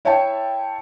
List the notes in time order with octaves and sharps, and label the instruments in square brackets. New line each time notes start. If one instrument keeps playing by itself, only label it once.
[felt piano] E4 C#5 E5 G5 A5